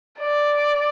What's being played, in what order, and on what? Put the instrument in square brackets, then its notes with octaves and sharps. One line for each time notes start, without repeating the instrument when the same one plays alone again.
[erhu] D5